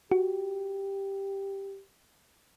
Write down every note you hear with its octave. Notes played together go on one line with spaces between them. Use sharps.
F#4 G4